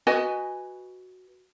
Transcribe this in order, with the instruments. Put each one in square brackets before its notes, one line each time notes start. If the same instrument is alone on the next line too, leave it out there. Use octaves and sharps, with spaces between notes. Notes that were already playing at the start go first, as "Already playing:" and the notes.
[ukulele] F#4 B4 D#5 G#5